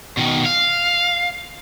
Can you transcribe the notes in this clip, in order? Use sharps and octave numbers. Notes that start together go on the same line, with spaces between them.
B2 D#3
F5